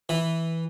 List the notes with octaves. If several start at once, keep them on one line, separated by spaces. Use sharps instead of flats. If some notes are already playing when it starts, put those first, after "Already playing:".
E3